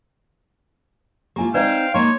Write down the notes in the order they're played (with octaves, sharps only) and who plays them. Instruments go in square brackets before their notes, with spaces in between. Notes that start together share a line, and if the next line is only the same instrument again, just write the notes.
[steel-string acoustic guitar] A#3 E4 F4 [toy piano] G4 G#5
[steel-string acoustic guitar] C4 D#4 C5 [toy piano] B4 D5 [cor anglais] F5 [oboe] G5
[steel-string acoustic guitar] A#3 D#4 [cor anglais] C#5 [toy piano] C6